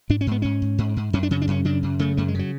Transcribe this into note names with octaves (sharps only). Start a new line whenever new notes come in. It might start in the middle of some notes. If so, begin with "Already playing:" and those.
G#2 D4
C#4
G#2 B3
G#2 C#4
G#2
G#2
G#2
F#2 C#4
D4
C#3 C#4
D4
F#2 C#4
C#3 D4
F#2
C#3 A3
F#2 A3
G#3
C#3 F#3